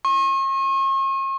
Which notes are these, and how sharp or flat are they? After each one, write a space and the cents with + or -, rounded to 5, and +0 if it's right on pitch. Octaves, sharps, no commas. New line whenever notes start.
C#6 -40